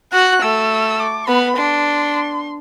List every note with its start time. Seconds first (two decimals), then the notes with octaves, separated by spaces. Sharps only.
0.13 F#4 F#6
0.42 A3 E6
0.99 D6
1.27 B3 B5
1.57 D4 C6